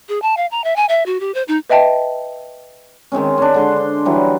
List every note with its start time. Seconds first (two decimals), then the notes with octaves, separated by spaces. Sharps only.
0.09 G#4
0.22 A5
0.37 F5
0.51 A#5
0.64 E5
0.76 G#5
0.89 E5
1.06 F#4
1.20 G4
1.34 C5
1.48 D#4
1.70 B4 D#5 E5 G5 A5
3.12 D#3 G#3 C4 C#4
3.38 C#4 D4
3.54 D3 G#3 C6
3.76 C5
4.05 E3 F#3 G3